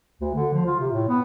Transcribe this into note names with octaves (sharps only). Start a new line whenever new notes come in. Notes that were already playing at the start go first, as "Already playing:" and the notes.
D2
D3
F3
F4
C3
A2
B3